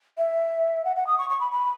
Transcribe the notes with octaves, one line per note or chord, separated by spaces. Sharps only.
E5
F#5
F#5
D#6
C#6
C#6
B5
B5